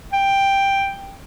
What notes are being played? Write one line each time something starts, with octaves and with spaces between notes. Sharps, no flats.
G5